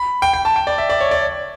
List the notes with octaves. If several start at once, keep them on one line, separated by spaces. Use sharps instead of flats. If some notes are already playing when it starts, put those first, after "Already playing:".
Already playing: B5
G5
G5
A5
G5
D5
E5
D5
C#5
D5